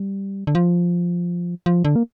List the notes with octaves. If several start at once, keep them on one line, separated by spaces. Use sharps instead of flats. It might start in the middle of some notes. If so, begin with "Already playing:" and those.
Already playing: G3
D3
F3
F3
D3
A#3